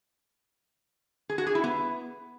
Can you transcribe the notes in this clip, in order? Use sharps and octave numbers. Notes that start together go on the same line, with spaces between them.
G#4
F#4
G#4
E4
B3